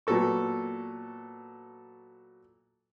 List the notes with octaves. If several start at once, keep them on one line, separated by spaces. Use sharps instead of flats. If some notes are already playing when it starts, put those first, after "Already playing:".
A#2 F#3 B3 A4 C#6